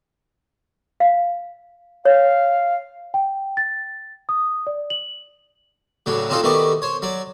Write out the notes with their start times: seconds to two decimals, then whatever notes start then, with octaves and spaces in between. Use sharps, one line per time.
1.00 F5
2.05 C#5 F5
3.14 G5
3.57 A6
4.29 D#6
4.67 D5
4.90 F#7
6.06 A2 C#3 F#3 D4
6.30 C4 D4 D#4 F4 A4 C5
6.43 D#3 A3 B3 F#4 G4 D5
6.82 C5 C#5
7.02 F#3 D5